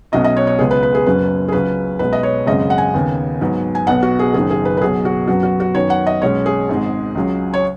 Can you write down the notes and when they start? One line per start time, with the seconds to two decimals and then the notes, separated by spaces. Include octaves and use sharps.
0.12 B1 B2 F#3 C#4 D#5
0.24 D#5
0.36 C#5
0.47 C#5
0.59 C#2 C#3 G#3 B3 G#4
0.71 B4
0.83 B4
0.95 G#4
1.06 F#1 F#2 F#3 C#4 B4
1.48 G#4
1.52 C#2 C#3 F#3 C#4 B4
1.99 B1 B2 G#3 B4
2.13 D#5
2.23 C#5
2.46 G#1 F#2 C#3 G#3 D#5
2.70 F#5
2.78 G#5
2.94 D#2 C#3 B3
3.41 G#2 F#3 B3
3.75 G#5
3.87 B1 B2 B3 F#5
4.02 F#4
4.19 G#4
4.34 F#1 F#2 D#3 G#4
4.51 G#4
4.65 B4
4.77 B4
4.81 B1 B2 F#3 G#4
5.05 F#4
5.27 F#2 F#3 B3 F#4
5.43 F#4
5.60 F#4
5.75 F#2 D#3 B3 C#5
5.90 F#5
6.07 D#5
6.22 B1 B2 G#3 C#4 C#5
6.46 G#4
6.69 G#1 G#2 G#3
7.15 C#2 C#3 F#3
7.54 C#5